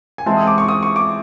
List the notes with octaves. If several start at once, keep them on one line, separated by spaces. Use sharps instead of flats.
G#5
E3 G#3 C4 E4 A5
D#6
D6
C#6
D#6
C#6
D6